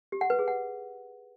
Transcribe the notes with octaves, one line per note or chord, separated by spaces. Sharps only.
G4
F#5
B4
G#4
F#5